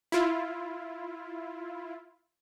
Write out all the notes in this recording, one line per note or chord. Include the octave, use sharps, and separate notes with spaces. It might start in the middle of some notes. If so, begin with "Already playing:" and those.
E4 F4